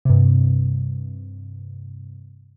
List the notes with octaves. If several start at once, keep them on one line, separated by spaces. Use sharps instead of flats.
G2 C3